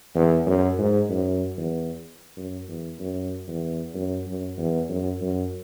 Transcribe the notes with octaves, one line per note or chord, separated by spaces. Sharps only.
E2
F#2
G#2
F#2
E2
F#2
E2
F#2
E2
F#2
F#2
E2
F#2
F#2